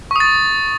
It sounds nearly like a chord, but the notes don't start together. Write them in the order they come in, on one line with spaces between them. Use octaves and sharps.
C#6 D#6 A6